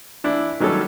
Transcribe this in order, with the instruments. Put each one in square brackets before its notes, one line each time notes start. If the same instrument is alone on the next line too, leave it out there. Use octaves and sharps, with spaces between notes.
[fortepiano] E3 D4 E4
D#3 F#3 G3 C#4 A4